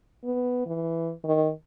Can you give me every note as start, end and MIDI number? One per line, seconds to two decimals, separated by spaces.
0.24 0.63 59
0.66 1.12 52
1.24 1.50 51